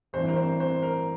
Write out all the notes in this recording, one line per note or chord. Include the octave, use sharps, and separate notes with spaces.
A1 G2 E3 C4 C5
A#4
C4 C5
C4 C5
A#4